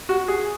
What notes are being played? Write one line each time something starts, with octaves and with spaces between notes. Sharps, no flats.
F#4
G#4